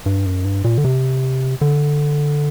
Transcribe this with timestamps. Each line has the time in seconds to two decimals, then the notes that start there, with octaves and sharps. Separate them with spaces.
0.06 G2
0.26 F#2
0.45 G2
0.64 A#2
0.78 D3
0.85 C3
1.61 D3